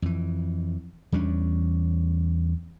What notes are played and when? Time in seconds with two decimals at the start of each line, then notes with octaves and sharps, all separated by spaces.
0.02 F2 E3
1.12 E2 G3 C#4 D4